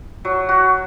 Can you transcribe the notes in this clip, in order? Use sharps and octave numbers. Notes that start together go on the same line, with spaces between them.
F#3
F#4